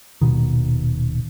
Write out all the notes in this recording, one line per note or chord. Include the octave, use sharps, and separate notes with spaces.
D#1 A#1 B2 D#3